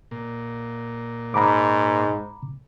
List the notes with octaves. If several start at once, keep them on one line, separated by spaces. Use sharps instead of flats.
A#2
G#2 A#5 B5 D6